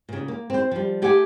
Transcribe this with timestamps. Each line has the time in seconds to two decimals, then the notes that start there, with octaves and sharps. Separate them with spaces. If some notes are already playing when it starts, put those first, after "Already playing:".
0.09 A#2 C#3
0.28 A#3
0.50 C4 C5
0.71 F3 G3
1.02 A3 G4 G#4 E5 F#5 G#5